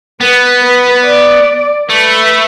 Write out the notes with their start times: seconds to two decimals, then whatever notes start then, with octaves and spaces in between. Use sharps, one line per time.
0.20 B3 B4
0.63 B4
1.05 D5
1.90 A3 B4